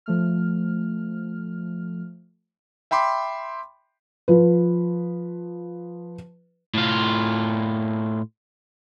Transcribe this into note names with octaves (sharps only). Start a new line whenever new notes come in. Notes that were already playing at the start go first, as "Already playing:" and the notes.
F3 A3 F6
E5 G5 B5 C6 D6
F3 B4
A2 F4